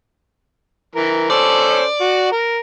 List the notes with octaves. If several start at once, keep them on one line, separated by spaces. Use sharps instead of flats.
E3 A#4
C#4 A4 C5 D5
F#4
A#4